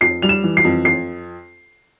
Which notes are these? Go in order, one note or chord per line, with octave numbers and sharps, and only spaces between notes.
F2 C7
G3 F7
E7
E3
C7
F2
F2 C7